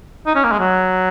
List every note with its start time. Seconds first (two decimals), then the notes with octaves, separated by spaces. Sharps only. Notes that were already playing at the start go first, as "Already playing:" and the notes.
0.26 D#4
0.35 C#4
0.44 A#3
0.52 G#3
0.60 F#3